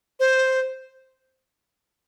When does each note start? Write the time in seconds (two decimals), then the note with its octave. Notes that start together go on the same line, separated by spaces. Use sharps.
0.20 C5